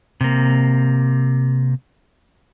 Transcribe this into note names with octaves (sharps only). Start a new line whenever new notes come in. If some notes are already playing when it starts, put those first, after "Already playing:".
C3 A#3